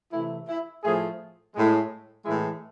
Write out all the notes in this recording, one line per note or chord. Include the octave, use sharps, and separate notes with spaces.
C3 E3 A3 E4
E4
A2 F3 A3 G#4
A2 G#3
A2 E3 G#3 E4